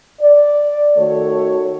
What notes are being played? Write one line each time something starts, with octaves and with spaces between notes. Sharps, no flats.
D5
D#3 A3 F#4 A4 C#5